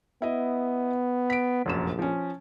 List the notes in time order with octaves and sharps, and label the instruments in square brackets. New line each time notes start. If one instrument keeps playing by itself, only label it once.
[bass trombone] B3 [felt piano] E4 D#5
[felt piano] B6 D7
[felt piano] F1 F#2 E7 [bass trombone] A#1
[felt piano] F3 C#4